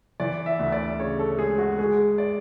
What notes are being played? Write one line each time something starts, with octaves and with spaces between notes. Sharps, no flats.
E3 D5
E5
D2
D5
C#3 C#5
A4
G#3 G#4
F#4
G#3 G#4
D5